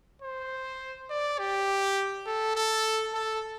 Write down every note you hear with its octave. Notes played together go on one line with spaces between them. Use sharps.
C5
D5
G4
A4
A4
A4